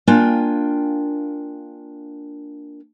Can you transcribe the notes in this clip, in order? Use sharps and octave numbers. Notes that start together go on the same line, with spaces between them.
A#3 D4 F4 G5 G#5